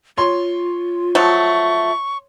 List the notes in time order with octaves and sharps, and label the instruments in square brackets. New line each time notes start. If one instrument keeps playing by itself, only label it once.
[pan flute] F4 [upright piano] C#5 C6
[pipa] F3 F#3 A3 [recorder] C#6